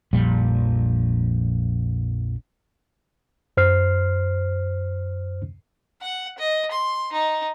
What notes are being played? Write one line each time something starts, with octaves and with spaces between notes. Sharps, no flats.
A#1 F2 A#2 G3
F#2 C5 F6 C7
F#5
D#5
C6
D#4